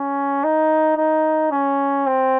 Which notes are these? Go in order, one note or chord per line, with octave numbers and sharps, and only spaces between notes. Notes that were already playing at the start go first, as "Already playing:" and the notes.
Already playing: C#4
D#4
D#4
C#4
C4